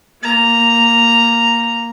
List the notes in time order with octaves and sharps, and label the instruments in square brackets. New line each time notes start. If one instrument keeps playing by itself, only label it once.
[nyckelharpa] A#3 A#5